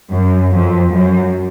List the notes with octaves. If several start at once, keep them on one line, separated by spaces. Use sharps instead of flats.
F#2
F2
F#2